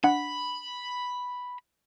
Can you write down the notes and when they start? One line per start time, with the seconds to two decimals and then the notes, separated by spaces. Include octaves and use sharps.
0.04 D4 F#5 B5